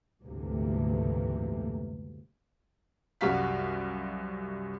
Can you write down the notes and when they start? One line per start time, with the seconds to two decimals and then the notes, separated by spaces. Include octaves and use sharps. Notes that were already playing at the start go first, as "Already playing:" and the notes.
0.23 F#1 D2 G#2 C3 E3 A#3
3.21 C2 F#2 G3 F#4 F5 B6